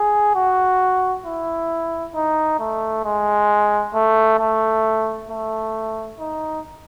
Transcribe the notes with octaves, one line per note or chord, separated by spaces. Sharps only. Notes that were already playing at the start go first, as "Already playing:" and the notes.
Already playing: G#4
F#4
E4
D#4
A3
G#3
A3
A3
A3
D#4